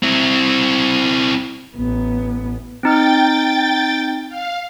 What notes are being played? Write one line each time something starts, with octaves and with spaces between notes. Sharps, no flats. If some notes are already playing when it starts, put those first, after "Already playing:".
C4 E4
A1 B3
C4 D#4 G5 F6 A6
F5